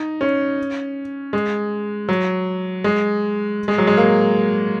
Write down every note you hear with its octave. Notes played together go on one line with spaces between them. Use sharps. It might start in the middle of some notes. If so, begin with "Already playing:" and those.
Already playing: D#4
C#4
G#3
F#3
G#3
G#3
F#3
G#3
A#3